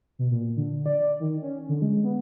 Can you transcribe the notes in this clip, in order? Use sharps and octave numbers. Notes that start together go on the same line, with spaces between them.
B2
A#2
D3
D5
D#3
C#4
D3
G#3
B3